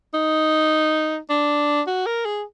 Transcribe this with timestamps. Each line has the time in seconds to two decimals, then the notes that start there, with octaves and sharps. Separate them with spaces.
0.14 D#4
1.30 D4
1.87 F#4
2.06 A#4
2.25 G#4